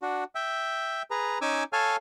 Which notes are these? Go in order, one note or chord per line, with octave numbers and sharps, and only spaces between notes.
D4 F#4
E5 G5
G#4 B4 A#5
C#4 D#4 G#5 D6 E6
A4 C#5 F5 G#5 A5 F6